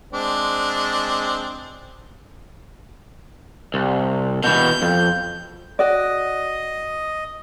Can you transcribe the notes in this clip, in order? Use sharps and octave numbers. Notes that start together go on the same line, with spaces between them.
G#3 C4 D4
C2
B2 E3 G6
F2
F#4 D5 D#5